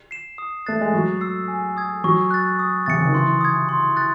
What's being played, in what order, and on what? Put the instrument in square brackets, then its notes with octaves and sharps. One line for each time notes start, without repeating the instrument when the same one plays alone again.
[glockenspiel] C7 E7
D#6
[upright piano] A3 [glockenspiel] F#6 A6 C7
[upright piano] G#3
[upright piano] F#3 [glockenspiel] C#6
[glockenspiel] E6 C7
G#5
D#6 G#6
[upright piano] F#3 [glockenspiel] C#6
[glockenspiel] F#6 A6
D#6
[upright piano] C3 [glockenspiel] A6 C#7
[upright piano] C#3
D#3
[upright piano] E3 [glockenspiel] C6
[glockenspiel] D#6 G#6
C6
F#6 A6